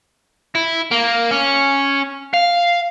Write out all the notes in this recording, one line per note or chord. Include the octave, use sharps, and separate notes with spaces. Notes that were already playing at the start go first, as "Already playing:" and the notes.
E4
A#3
C#4
F5